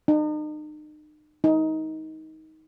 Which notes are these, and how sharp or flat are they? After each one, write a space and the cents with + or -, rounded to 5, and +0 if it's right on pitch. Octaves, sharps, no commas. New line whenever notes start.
D#4 -40
D#4 +20